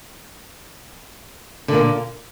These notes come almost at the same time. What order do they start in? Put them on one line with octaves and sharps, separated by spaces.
D3 A#2 A#3